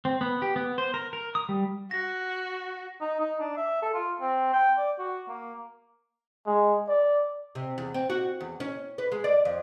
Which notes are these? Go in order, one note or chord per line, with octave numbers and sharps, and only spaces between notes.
C4
B3
G4
B3
C5
A#4
A#4
D#6
G3
F#4 A#6
D#4
D#4
D4
E5
A4
F4
C4
G5
D5
F#4
A#3
G#3
D5
C3
E2
C4
F#4
E2
C#4
B4
G#3
D5
F2